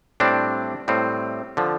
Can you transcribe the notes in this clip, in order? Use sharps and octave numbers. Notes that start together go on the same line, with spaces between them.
A2 G3 C4 D4
A2 G3 C4
D3 F3